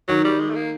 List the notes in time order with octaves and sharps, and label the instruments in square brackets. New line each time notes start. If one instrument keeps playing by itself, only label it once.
[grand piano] D#3 [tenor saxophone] F#3
[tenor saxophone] G3
G#3
A3
A#3